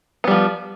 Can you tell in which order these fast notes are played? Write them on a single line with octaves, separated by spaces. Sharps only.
B3 G3 F3